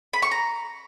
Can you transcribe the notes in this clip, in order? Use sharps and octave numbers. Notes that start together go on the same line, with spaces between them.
B5
C#6
A#5